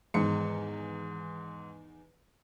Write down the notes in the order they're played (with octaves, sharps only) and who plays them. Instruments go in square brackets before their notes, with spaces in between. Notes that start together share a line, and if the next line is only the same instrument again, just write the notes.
[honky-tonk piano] E2 D#3 C#7 [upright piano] G#2